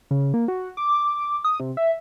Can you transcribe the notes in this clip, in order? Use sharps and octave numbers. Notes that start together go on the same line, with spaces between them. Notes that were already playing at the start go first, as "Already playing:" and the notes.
C#3
A#3
F#4
D6
D#6
C3
E5